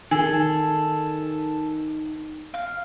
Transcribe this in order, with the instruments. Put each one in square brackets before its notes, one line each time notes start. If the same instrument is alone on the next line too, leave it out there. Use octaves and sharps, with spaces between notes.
[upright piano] D#3 [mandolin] G#4 A4
[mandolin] F5